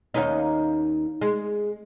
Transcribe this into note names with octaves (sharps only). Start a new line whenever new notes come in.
D#2 C#4 D#4
G#3